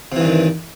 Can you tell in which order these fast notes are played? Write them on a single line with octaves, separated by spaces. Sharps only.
C3 E3 G2 D#3